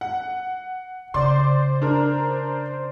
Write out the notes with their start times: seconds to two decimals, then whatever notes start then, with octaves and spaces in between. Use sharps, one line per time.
0.01 F#5
1.14 C#3 C5 D5 C6
1.82 D4 A#4